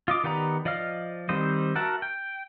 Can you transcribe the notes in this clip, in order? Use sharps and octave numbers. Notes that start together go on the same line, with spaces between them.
F4 D#5 D6
D#3 B3 G4 D5 A#5
F3 D5 D#5 F5 F6
D#3 G3 C4 C5 D#5
F#4 A#4 E5 F#5 A5
G5